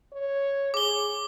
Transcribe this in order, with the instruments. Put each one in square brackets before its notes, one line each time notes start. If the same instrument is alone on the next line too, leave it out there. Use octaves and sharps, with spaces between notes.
[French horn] C#5
[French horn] G#4 [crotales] D6 G7